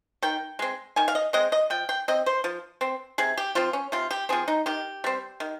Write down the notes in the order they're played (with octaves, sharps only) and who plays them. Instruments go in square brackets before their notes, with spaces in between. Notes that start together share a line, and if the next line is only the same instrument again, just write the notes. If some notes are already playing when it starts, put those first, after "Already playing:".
[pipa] D#3 G5
G#3 C4
D#3 G#5
F5
D#5
G#3 C4 D#5
D#5
F3 G5
G5
C4 D#5
C5
F3
C4
C3 G#4
G4
F3 C4 F4
C#4
C3 F4
G4
F3 C4 G#4
D#4
D#3 G4
G3 C4
D#3